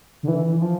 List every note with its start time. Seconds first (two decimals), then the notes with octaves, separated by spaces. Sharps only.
0.23 D3
0.28 E3
0.55 E3
0.62 F3